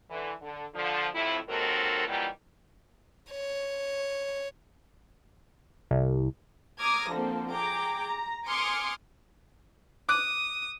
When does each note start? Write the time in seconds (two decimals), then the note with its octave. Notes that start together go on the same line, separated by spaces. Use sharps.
0.10 D3 E3
0.42 D3
0.74 D3 F3
1.14 F2 A2 C3 E4
1.48 D#2 G#2 F#3 C4 A4 A#4
2.07 A#2 D#3 E3 F#3 G3
3.31 C#5
5.91 C2
6.81 A#5 D6 D#6 F6 G#6 A#6
7.12 D3 F3 A#3 C4 A4
7.52 G#4 G5 A#5 D6
8.04 A#5
8.47 G#5 C6 D6 D#6 F6 C#7
10.09 D6 D#6 F#6